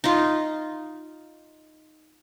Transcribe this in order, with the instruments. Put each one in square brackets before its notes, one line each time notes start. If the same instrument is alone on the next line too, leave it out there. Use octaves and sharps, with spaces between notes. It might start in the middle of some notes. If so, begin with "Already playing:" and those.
[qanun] D#4 F4